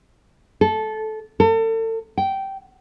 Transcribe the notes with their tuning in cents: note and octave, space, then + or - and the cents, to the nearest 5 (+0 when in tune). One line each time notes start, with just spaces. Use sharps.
A4 -15
A4 +35
G5 -15